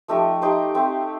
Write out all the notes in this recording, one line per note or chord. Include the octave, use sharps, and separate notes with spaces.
F3 A3 D#4 G4
D#4 G4 C5
A3 C4 G4